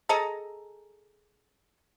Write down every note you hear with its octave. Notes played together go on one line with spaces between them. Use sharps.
G#4 A4 D#5 A#5